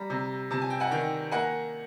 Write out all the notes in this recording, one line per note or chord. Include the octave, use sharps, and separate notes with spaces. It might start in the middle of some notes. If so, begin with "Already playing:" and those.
Already playing: G3 A#5
C3
C3 A5
G#5
G5
F#5 G#5
D#3 G5
A#3 F#5 G#5